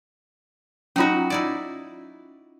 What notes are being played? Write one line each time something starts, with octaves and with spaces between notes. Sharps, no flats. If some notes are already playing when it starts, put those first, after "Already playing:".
F#3 C#4 D#4 F4 F#4
D#4 E4 D5